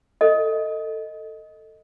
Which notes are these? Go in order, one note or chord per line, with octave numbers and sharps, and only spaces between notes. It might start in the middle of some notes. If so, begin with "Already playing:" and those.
A4 D#5